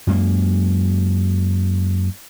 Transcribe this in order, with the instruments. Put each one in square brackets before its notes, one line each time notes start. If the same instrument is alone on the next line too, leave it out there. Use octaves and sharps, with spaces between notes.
[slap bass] F#2 G#3 A#3